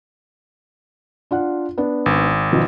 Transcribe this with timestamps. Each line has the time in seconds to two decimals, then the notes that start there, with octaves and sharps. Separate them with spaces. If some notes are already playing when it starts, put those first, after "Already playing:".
1.31 D4 F4 F#5
1.78 B3 D4
2.06 G#1
2.52 B2 F3 D#4